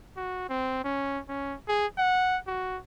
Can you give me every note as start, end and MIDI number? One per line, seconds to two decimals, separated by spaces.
0.17 0.49 66
0.49 0.83 60
0.84 1.20 61
1.29 1.55 61
1.68 1.87 68
1.98 2.38 78
2.47 2.78 66